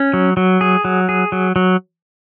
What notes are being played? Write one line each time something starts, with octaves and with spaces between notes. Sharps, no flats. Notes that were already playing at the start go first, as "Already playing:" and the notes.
Already playing: C#4
F#3
F#3
G#4
F#3
G#4
F#3
F#3